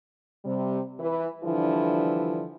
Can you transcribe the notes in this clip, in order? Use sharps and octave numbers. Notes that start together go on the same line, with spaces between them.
C3 G3
E3 B4
D3 E3 F3 G3 D4 E4